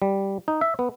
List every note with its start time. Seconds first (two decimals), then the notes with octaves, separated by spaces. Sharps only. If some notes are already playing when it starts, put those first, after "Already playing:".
0.02 G3
0.48 D#4
0.61 E5
0.79 B3